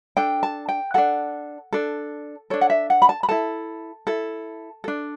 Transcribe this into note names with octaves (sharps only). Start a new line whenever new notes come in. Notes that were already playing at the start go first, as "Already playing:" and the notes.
D4 A4 G5
A5
G5
D4 A4 F#5
D4 A4
D4 A4 C#5
F#5
E5
F#5
B5
A5
B5
E4 A4 A5
E4 A4
D4 A4